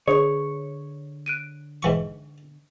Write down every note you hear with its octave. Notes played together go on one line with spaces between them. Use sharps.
D3 G#4 B4 C#5 C#6
F#6 D7 D#7
G#2 E3 C#6